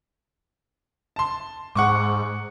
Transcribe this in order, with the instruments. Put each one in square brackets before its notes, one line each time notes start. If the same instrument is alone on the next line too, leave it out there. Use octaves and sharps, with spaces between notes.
[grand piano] A5 C6
[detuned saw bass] G#2 [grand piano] F#5 C#6 D6